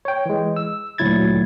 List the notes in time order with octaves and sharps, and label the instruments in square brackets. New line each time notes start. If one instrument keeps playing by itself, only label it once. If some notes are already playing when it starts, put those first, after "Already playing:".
[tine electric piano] C#5 G5
E3 G#3
E6
D2 A#2 F#3 E4 G#6 A6